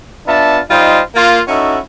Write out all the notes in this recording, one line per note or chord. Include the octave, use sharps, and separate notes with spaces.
B3 D4 F4 E5 A5
G3 D#4 F4 C5 D#5
A#3 F4
C#4 D#4 E4 F#4 A4